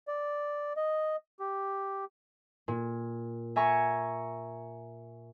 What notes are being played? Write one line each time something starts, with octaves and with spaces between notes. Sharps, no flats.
D5
D#5
G4
A#2
E5 G#5 A#5 C#6